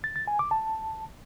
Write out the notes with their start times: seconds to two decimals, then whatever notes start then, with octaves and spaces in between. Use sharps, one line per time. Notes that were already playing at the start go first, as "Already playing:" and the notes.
0.04 A6
0.16 A6
0.27 G#5
0.39 D6
0.51 A5